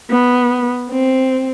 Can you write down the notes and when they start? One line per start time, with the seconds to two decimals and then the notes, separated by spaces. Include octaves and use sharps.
0.10 B3
0.90 C4